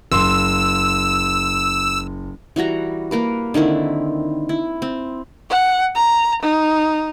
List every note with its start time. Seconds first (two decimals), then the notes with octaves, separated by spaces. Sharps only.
0.12 F#1 C6 E6
2.56 E3 G3 F#4 A#5
3.11 A#3 A#4 B4
3.54 D3 D#3 C4 E4
4.49 E4
4.82 C4
5.49 F#5
5.95 A#5
6.42 D#4